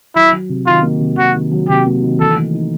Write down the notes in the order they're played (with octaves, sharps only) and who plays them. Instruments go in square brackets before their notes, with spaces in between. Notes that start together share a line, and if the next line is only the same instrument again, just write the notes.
[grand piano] F#3 [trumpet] E4
[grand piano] F#3
C3
[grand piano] D#3 [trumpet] F4
[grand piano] A#3
C3
[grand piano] C3 [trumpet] F#4
[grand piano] D#3
F#3
[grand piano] C3 [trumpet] G4
[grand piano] A#3
D#3
[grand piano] E3 [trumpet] A4
[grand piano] A3
D#4